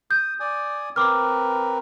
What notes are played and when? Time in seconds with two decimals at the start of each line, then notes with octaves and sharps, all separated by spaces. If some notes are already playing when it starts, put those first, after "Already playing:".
0.11 D#6 G6
0.40 D5 G#5 D#6
0.96 C4 A#4 B4 D6 F6